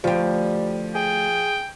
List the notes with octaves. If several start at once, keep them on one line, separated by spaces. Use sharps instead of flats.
D2 F3 G3 G4
G#4 G5